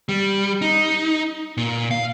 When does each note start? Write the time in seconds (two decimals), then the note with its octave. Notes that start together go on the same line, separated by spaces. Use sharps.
0.09 G3
0.62 D#4
1.57 A#2
1.91 F5